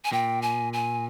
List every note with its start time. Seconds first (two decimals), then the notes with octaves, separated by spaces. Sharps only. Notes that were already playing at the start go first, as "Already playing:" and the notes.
0.05 G#5
0.12 A#2 G5
0.42 G#5
0.73 G#5